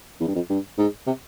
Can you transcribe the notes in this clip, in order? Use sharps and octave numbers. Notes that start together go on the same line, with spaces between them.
E2
G2
F2
G2
G#2
C3